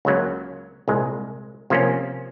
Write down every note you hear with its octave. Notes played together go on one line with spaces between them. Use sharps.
C#2 C#3 F#3 A#3
C2 A#2 G#3
C3 F3 A#3 C#4